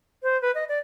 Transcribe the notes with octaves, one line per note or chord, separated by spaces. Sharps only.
C5
B4
D#5
D5